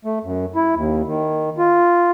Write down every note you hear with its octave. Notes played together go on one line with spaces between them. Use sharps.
A3
F#2
E4
D#2
D#3
F4